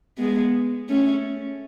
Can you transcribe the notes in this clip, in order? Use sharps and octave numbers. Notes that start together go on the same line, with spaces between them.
G#3 B3
A3 C#4